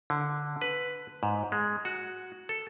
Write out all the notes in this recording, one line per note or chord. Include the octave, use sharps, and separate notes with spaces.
D3
B4
G#2
G#3
F#4
A4